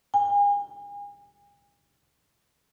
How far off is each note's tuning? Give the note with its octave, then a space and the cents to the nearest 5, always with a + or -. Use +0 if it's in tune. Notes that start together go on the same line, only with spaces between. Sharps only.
G#5 -40